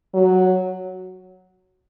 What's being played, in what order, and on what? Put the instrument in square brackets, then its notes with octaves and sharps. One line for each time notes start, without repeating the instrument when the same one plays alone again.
[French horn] F#3